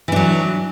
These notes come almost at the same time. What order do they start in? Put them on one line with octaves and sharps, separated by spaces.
E3 D4 F#3